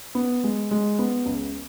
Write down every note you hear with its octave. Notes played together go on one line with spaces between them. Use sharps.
B3
G#3
G#3
B3
C#2